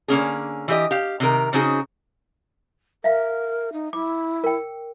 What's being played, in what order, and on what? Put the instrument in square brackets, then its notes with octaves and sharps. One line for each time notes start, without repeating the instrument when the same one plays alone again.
[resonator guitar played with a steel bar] D3 A#3 C#4 G#4
E3 G4 D#5
G4 F5
C3 D#3 A#4
C#3 C4 C#4 D#4 F#4 G#4
[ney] A#4 [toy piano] E5 F5
[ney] D#4
[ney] E4 [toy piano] D6
[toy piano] A#4 G5